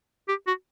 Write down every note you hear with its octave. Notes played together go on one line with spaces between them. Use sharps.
G4
F#4